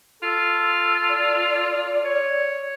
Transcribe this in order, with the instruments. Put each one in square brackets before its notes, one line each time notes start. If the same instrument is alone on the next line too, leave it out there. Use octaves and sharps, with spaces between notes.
[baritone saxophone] F4 [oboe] A4
[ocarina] D5
[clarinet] C#5